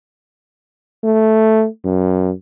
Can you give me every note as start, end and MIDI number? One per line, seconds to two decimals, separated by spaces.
1.04 1.67 57
1.85 2.32 42